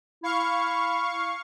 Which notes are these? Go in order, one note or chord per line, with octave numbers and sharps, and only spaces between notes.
E4 F5 C#6